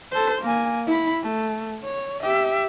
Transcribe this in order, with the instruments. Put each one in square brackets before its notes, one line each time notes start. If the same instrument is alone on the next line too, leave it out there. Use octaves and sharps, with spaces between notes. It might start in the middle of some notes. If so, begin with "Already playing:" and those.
[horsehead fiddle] A4 C5
A#3 G#5
E4 B5
A3
C#5
G4 E5